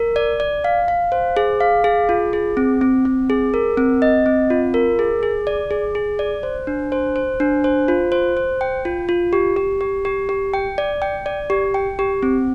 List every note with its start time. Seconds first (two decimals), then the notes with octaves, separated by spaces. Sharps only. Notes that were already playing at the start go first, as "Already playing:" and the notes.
Already playing: A#4
0.16 D5
0.40 D5
0.64 F5
0.88 F5
1.12 C5
1.37 G#4
1.60 F5
1.84 G#4
2.09 F4
2.33 G#4
2.57 C4
2.81 C4
3.05 C4
3.30 G#4
3.54 A#4
3.77 C4
4.02 D#5
4.26 C4
4.50 F4
4.74 A#4
4.99 G#4
5.23 G#4
5.47 D5
5.71 G#4
5.95 G#4
6.19 D5
6.43 C5
6.67 D4
6.92 C5
7.16 C5
7.40 D4
7.64 C5
7.88 F4
8.12 C5
8.37 C5
8.61 G5
8.85 F4
9.09 F4
9.33 G4
9.56 G4
9.81 G4
10.05 G4
10.29 G4
10.54 G5
10.78 D5
11.02 G5
11.26 D5
11.50 G4
11.74 G5
11.99 G4
12.23 C4